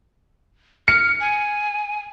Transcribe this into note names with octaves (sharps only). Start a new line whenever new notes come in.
F6 C#7
G#5